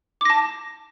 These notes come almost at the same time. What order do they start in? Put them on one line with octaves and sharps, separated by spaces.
D6 A#6 A5